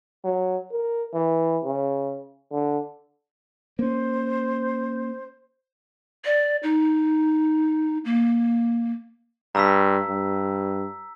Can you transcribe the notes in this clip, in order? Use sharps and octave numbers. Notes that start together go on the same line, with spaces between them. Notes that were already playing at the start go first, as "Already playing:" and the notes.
F#3
A#4
E3
C#3
D3
A#3 C#4 C5
D5
D#4
A#3
G2 A#5 E6 B6
G2